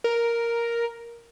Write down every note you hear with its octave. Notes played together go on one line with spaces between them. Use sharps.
A#4